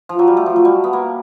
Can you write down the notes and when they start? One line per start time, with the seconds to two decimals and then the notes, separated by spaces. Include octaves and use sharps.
0.09 F3
0.19 F#3
0.27 G3
0.37 A3
0.46 F3
0.56 F#3
0.65 G3
0.84 B3
0.93 A#3